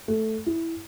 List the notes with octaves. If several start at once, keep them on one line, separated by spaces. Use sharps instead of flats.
A3
E4